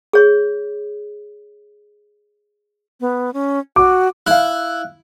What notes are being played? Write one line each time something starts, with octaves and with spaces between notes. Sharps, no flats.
G#4 C#5 C#6
B3
C#4
F#4 D6
E4 F5 F#6